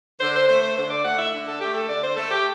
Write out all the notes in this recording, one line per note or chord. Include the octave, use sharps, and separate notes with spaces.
D3 C5
C5
A3 C5
C5
D3 C5
D5
A3 F#5
E5
D3
A4
A3 G4
A4
D3 D5
C5
A3 A4
G4